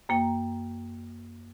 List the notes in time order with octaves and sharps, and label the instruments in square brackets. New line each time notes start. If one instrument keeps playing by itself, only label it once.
[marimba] F#2 A#3 G5